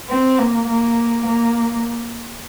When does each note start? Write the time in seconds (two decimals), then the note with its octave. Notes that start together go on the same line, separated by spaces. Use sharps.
0.09 C4
0.38 A#3
0.68 A#3
1.26 A#3